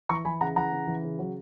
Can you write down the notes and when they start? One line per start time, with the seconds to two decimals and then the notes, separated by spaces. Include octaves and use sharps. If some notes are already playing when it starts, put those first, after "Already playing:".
0.09 E3 A#5 C#6
0.25 E3 G#5 B5
0.41 C#3 F#5 A#5
0.56 E3 F#5 A#5
0.72 C#3
0.87 E3
1.04 C#3
1.19 F#3